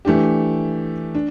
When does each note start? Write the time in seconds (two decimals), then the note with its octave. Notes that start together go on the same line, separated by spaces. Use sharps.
0.05 E3 A3 D4 G4
1.15 D4